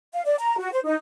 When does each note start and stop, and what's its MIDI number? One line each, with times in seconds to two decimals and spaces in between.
0.13 0.23 77
0.25 0.36 74
0.39 0.58 82
0.58 0.70 66
0.72 0.80 72
0.86 0.96 63